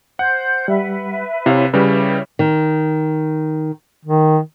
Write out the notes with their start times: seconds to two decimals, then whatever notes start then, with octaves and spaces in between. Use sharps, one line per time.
0.19 C5 F#5 G6
0.68 G3 B4 E5
1.46 C3 E4 C#5 F5
1.74 C#3 G3 E4 B4 C#5
2.39 D#3
4.05 D#3